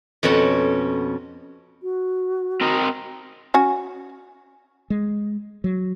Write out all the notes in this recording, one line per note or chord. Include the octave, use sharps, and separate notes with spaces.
F2 B2 B3 C#4 F#5
F#4
C4 A#4 D#5
C#4 F#4 G#5
G#3
F#3